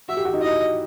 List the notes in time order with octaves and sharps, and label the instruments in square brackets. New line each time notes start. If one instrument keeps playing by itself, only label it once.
[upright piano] F#4 [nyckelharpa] E5
[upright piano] G4
F#4
D#4
[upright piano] E4 [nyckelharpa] D#5